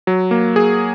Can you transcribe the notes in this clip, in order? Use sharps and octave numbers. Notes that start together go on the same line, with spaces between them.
F#3
A#3
G#4